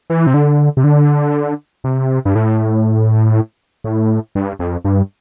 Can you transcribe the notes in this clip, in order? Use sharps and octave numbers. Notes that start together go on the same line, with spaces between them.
E3
C3
D3
C3
D3
C3
G2
A2
A2
G2
F2
G2